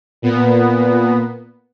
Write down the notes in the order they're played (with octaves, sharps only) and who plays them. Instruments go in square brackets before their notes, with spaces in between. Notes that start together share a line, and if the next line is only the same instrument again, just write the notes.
[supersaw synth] A#2 B3